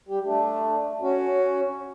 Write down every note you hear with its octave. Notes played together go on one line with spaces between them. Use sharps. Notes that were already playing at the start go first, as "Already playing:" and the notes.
G3 G4
A3 D4
C#4 F#4